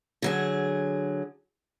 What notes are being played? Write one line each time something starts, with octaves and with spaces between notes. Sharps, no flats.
D3 F#3 G#4